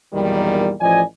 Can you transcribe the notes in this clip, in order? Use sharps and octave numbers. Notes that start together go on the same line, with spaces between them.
B1 E2 A#2 D#3 G3
A1 F3 D5 D#5 G#5